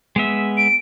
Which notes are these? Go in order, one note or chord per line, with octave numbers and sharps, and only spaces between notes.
G#3 B3 E5
D7